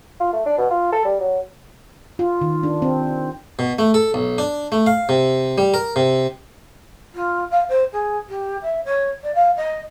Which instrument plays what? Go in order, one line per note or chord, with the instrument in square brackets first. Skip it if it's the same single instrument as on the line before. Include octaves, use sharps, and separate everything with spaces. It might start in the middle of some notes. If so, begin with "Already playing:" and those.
[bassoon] F4
A3
D4
B2
F4
A4
G3
F#3
[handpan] F4
D#3
D4
C4
[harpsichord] B2
A3
A4
B1
D4
A3
F5
C3
G3
A#4
C3
[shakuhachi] F4
F5
C5
G#4
G4
E5
C#5
D5
F5
D#5